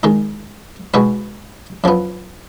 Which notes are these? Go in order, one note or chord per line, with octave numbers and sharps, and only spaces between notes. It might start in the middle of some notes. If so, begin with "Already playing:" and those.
D#3 G#3 D#4
B2 G#3 D#4 F#4 B4
F#2 F3 B3